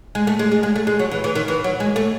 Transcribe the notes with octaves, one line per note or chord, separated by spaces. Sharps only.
G#3
A3
G#3
G#3
G#3
A3
G#3
F#3
E3
E3
D#3
E3
F#3
G#3
A3